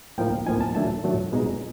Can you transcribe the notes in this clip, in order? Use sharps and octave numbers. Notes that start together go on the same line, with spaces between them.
A2 F3 A#3 D#4 G5
A2 F3 A#3 D#4 G#5
A5
D#3 F#3 A3 D4 A5
D#3 F#3 A3 D4
B2 G#3 B3 D#4